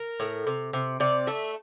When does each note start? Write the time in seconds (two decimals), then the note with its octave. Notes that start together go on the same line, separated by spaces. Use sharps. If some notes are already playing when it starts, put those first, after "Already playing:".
Already playing: A#4
0.20 A2
0.47 C3
0.73 C3
1.00 C3 D5
1.27 A3 E5